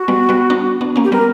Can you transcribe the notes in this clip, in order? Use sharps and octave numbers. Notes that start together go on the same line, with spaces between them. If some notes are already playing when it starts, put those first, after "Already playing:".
Already playing: F#4
G3 B3
G3 B3
B3 D4
B3 D4
A#3 C#4
G4
G3 B3 A#4